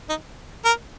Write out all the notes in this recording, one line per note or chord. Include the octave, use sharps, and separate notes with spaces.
D#4
A#4